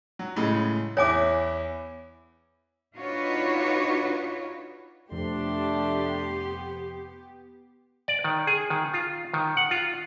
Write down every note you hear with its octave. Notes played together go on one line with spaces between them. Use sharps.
F#3
A2 C#3 G#3
E2 E4 C#5 G#5 D6
D4 D#4 F4 F#4 B4 C#5
F2 C3 A3 B3 D4 G4 C6
D5
D#3
G#4
D#3
F4
D#3
F#5
F4